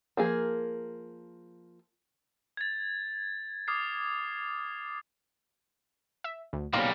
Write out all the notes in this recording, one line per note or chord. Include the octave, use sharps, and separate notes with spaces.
F3 A#3 G#4
G#6 A6
D6 D#6 F6 G#6 C7
E5
D2
B1 G3 A#3 C#4 A#5 C6